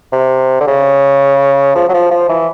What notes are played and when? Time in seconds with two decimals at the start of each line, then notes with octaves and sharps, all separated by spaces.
0.12 C3
0.60 D3
0.67 C#3
1.75 F3
1.89 F#3
1.94 F3
2.11 F3
2.29 E3